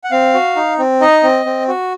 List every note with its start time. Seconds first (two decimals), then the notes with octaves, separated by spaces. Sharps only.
0.04 F#5
0.11 C4 F5
0.34 F#4
0.56 D#4
0.79 C4
1.01 D#4 D#5
1.23 C4
1.46 C4
1.68 F#4